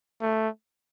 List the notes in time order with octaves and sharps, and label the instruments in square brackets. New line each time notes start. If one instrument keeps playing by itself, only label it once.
[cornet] A3